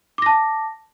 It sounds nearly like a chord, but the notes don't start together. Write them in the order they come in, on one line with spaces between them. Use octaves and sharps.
D6 A#6 A5